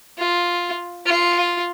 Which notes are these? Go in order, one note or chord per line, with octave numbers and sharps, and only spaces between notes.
F4
F4